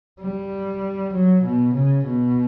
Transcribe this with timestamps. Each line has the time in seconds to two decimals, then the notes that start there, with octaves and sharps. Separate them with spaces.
0.21 G3
1.13 F#3
1.43 B2
1.74 C#3
2.04 B2